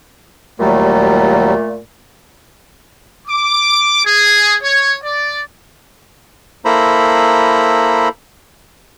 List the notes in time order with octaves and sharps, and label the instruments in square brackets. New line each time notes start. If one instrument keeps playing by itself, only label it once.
[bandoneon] D#2 F#3 G3 [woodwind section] A#2 A3
[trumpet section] D6
G#4
C#5
D5
[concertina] A#3 E4 A4 C5 A#5 B5